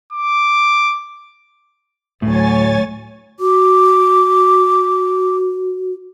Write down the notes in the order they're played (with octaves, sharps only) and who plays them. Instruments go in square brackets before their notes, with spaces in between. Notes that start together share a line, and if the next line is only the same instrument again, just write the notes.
[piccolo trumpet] D6
[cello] D2 F#3 [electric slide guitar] A2 [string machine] C#5 G#5 A6
[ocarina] F#4 [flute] D6